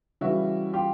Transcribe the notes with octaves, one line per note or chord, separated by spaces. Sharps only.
C#3 E3 G3 E4 F#4
F4 G4